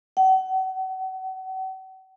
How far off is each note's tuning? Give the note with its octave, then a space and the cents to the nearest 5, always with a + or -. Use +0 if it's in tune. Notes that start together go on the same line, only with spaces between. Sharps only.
F#5 +45